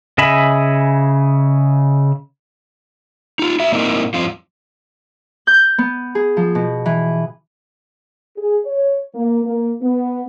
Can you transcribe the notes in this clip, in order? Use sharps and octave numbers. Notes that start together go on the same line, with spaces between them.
C#3 D#5 E5 G#5 B5
D#4 F4
F#4 E5
A#2 A#3 C4 D#4 E4 A#4
G2 F3 C4 F4
G6
B3
G#4
F3
B2
E3
G#4
C#5
A#3
A#3
B3